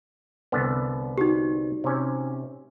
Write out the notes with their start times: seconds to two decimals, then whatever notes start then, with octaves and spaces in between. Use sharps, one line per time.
0.52 C2 D3 B3
1.18 D#4 F#4 G4
1.84 C3 C#4